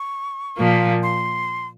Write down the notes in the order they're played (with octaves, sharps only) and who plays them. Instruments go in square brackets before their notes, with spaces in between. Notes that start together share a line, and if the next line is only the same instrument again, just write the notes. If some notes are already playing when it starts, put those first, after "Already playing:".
Already playing: [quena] C#6
[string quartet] A#2 F3 A#3
[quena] C6